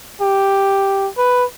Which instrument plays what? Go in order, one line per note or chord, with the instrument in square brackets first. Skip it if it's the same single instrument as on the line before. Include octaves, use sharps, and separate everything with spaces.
[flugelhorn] G4
B4